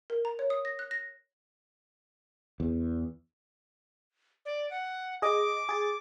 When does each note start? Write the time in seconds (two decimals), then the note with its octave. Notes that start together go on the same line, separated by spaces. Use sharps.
0.10 A#4
0.25 A#5
0.39 C#5
0.50 D#6
0.65 A#6
0.79 F#6
0.91 A#6
2.60 E2
4.45 D5
4.71 F#5
5.22 G#4 D#5 D6
5.69 G#4 A6